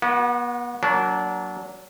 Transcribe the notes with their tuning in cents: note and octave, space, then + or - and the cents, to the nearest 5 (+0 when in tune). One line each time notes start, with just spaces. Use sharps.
B3 -40 F#4 +0
F#3 +5 A#3 +0 D4 -25